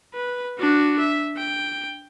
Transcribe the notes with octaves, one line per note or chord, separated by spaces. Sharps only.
B4
D4 F#4
E5
G5